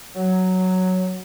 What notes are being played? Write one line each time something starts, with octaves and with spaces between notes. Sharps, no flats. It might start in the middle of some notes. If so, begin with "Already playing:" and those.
F#3